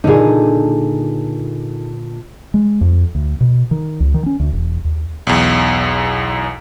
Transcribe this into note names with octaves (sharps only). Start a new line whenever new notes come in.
A#2 D3 D#4 G#4
G#3
F2
D2
B2
D#3
C#2
D#3
C#4
D2
E1
D#2
B1 E2